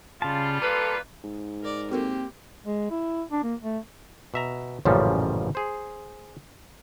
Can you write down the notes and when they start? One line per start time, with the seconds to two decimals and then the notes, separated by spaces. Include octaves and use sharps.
0.22 C#3 G3 F4 A5
0.62 A#3 A4 B4
1.24 G#2
1.62 A#4 D5
1.91 A#3 C4 F#4 G4 A4 A#4
2.65 G#3
2.91 E4
3.32 D4
3.43 A#3
3.62 A3
4.34 B2 E5 A#5
4.85 A1 F#2 A#2 C#3 F3 G3
5.55 G#4 C5